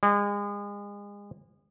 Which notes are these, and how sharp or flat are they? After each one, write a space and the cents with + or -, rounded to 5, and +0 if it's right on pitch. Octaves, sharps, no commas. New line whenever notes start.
G#3 -35